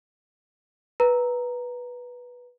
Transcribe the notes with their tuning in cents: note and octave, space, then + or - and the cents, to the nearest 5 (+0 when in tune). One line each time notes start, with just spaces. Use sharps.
B4 -10 A#5 +0